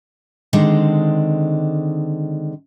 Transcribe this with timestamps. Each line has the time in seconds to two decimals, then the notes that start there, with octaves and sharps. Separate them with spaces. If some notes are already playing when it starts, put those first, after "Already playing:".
0.53 D3 D#3 G#3 C4 D4